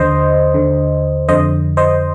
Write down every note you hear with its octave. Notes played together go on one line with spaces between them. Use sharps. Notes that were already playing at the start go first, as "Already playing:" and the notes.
Already playing: D#2 D3 C5 D#5
D#2 D3
F2 D3 C5 D#5
C5 D#5